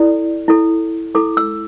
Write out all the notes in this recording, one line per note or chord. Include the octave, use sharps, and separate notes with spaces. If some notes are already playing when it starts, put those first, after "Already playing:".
Already playing: E4 A4 D5
E4 A4
E4 A4 D6
E6